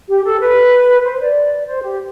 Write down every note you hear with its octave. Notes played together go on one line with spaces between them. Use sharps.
G4
A4
B4
C5
D5
C5
G4